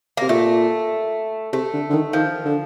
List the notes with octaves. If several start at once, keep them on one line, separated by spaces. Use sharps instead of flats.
C3 A#3
A#2 A3
C3 A3
D3
D3
D#3
D#3 F3
D3